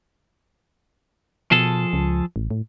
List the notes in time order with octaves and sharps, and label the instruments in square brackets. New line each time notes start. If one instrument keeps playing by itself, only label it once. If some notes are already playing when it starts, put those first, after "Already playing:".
[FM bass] B2 [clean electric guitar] F3 G#4 A4
[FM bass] C#2
A1
A2